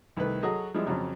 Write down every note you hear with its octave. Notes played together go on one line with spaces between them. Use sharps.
C2 D#3 A3 B4
F#3 F#4 G#4 A4 C#5 D#5
F3 G3 G#3 E4
F2 C#3 F3 F#3